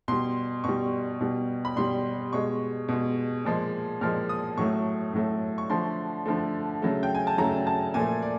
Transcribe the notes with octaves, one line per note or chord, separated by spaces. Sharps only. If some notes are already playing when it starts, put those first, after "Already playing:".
B2 G3 C6
B2 G3 C#6
B2 G3
B5
B2 G3 C6
B2 G#3 C#6
B2 G#3
A#2 F3 G#3
A#2 F3 G#3 F6
D#6
A2 F#3 A3 C#6
A2 F#3 A3
C#6
D3 F3 A3 C6
D3 F3 A3
C#3 F#3 A3
G5
G#5
A5
C#3 F#3 A3 A#5
A5
A#2 F3 A3 G#5
D5